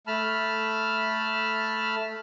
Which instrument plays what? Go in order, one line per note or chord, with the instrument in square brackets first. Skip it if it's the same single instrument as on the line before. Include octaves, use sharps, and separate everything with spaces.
[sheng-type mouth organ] A3 A5 B5 F6